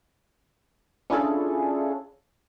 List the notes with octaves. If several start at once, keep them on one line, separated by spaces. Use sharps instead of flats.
C#4 D4 E4 F4 G#4 A4